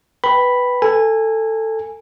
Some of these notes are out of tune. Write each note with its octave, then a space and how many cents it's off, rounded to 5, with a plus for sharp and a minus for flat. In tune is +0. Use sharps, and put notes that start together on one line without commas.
B4 +0 G5 +0 B5 +0
A4 +15 G#5 -15